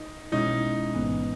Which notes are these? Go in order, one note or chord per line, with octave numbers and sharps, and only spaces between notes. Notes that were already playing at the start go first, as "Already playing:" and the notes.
Already playing: D#4
B1 B2 G#3 C#4 D#4 E4
A1 G#2 E3 B3